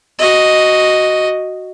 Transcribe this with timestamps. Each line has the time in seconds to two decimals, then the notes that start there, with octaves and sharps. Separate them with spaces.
0.19 F#4 D#5